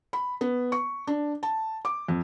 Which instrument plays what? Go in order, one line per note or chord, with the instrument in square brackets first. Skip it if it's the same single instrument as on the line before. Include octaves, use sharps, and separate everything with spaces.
[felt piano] B5
B3
C#6
D4
A5
D6
F2